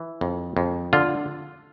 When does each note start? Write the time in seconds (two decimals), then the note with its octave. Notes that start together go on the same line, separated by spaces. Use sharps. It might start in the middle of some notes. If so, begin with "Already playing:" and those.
Already playing: E3
0.21 F2
0.57 F2
0.93 D3 F4